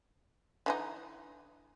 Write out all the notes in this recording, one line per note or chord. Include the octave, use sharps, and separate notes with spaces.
D3 E3 D#4